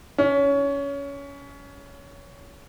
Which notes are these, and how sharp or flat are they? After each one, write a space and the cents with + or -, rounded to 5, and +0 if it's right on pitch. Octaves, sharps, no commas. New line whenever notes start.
C#4 +20